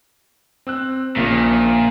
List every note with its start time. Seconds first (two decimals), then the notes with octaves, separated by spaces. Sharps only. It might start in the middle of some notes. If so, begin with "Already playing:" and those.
0.67 C4 E6 F#6
1.16 A#1 A#2 C#3 F3